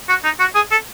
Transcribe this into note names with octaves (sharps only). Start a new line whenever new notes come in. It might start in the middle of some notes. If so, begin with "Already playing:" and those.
F#4
D#4
F#4
G#4
A4